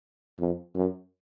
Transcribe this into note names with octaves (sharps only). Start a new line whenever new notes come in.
F2
F#2